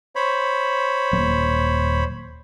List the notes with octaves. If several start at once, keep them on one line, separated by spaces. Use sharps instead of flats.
C5 C#5 B5
D#1 F#3 A#3